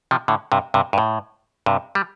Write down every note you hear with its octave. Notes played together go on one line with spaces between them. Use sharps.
C3 F3
A2 D3
G2 C3
G2 C3
G2
A2
G2 C3
G3